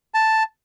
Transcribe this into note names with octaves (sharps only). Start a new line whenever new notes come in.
A5